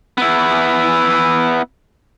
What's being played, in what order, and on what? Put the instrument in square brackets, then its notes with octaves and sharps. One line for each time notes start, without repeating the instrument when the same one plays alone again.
[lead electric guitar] B3 E4